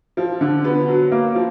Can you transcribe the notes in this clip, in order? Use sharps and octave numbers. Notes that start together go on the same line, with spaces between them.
F3
D3
B3
F#3
A#3
F3